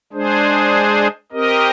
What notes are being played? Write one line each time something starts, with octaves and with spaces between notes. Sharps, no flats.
G#3 D4 G#4 C5
C4 G4 A#4 D#5